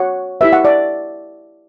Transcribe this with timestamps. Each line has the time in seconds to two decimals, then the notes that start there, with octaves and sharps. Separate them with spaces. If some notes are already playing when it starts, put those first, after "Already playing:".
Already playing: F#4 C#5 F#5
0.41 E4 G4 B4 E5
0.53 F#5
0.65 D5